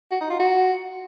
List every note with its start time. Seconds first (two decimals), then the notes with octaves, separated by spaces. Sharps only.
0.12 F#4
0.21 D#4
0.30 F4
0.40 F#4